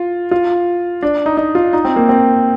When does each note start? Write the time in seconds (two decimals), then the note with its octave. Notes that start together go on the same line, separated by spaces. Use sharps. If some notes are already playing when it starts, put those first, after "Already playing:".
Already playing: F4
0.31 F4
1.02 D4
1.26 D#4
1.37 D#4
1.55 F4
1.73 D#4
1.85 C4
1.96 A#3
2.09 C4